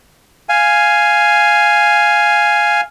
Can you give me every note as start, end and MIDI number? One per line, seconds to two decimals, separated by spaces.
0.49 2.81 77
0.49 2.81 80